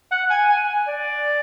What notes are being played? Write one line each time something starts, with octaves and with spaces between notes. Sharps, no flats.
F#5
G#5
G#5
D5